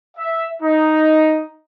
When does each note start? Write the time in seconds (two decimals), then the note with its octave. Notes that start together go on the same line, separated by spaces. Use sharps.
0.17 E5
0.63 D#4